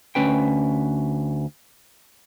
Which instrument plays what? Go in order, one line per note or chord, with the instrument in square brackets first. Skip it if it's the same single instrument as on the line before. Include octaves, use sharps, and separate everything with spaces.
[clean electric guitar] D2 C#4 B4 G5